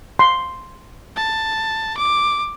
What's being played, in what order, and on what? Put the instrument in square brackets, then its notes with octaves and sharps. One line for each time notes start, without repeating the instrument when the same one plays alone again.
[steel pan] C6
[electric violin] A5
D6